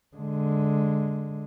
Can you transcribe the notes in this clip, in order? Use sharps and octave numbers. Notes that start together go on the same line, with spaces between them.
D3 G#3